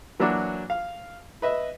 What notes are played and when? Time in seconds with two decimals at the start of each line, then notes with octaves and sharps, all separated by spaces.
0.20 E3 F#3 A#3 D4 E4 F#4
0.70 F5
1.42 B4 D#5 E5